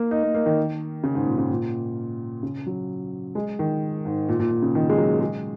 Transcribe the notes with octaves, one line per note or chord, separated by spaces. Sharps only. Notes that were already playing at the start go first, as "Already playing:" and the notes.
Already playing: A#3
D#4
A#3
A#3
D#3
C#3
G#2
A#2
C#3
A#2
C#3
F#3
G#3
D#3
G#2
A#2
A#2
A#2
C#3
D#3
G#3
F#3
G#3